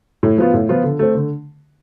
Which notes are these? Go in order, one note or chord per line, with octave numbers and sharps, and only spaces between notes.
A2
F3 B3 F4
A2
F3 B3 F4
D3
A3 C4
D3